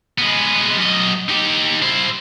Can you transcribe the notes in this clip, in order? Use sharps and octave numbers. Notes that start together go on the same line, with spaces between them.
G#3 B3
F#2 D#5
D#4 G4
E4 C5